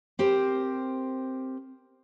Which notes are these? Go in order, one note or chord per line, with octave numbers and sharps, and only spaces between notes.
C4 G4 A#4 C5